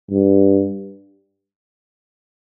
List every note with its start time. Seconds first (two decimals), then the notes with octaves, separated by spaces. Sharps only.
0.11 G2